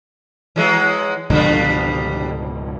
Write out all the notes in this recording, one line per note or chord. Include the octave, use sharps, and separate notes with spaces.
E3 F#3 G#3
C#2 G#2 B2 D3 F3 G3